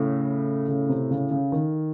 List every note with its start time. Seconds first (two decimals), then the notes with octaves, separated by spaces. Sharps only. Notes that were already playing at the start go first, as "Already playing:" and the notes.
Already playing: A2 C#3
0.68 C#3
0.89 C3
1.11 C#3
1.31 C#3
1.52 D#3